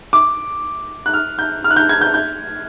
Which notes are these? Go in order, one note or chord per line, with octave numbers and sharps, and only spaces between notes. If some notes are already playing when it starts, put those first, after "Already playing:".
D6
F#6
F6
G6
F6
F#6
G6
G#6
G6
G6